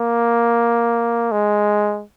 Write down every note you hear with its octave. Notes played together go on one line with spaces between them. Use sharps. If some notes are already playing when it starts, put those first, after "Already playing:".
Already playing: A#3
G#3